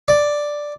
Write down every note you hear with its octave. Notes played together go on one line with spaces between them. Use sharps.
D5